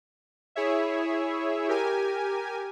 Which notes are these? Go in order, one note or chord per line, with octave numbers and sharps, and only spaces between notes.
E4 G#4 C#5 E5
G4 A#4 G#5